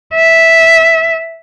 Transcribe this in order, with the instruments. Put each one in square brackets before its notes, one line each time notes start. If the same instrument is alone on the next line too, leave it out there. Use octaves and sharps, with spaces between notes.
[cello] E5